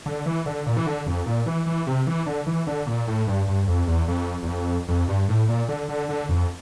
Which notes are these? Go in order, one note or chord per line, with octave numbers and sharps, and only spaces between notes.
D3
E3
D3
A#2
E3
D3
F2
A#2
E3
E3
C3
E3
D3
E3
D3
A#2
A2
G2
G2
F2
E2
F2
E2
F2
F2
G2
A2
A#2
D3
D3
D3
F2